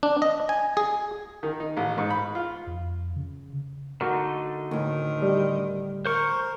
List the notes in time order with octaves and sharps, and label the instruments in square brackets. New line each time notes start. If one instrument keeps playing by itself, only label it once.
[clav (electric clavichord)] D4
D#5
G#5
G#4
[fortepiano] D#3
D#4
A1
G#2
B5
F4
[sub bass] F2
C#3
[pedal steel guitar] D3 A3 D#4 [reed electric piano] F#4 A#4
[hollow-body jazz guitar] D2 A2 [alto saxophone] D#3
[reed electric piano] G3
[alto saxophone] A#4 [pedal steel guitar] C5 C#6